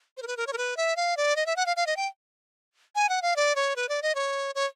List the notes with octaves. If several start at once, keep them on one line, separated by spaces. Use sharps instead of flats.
C5
A#4
B4
A#4
C#5
A#4
B4
E5
F5
D5
D#5
E5
F#5
F5
F5
D#5
G5
G#5
F#5
F5
D5
C#5
B4
D5
D#5
C#5
C#5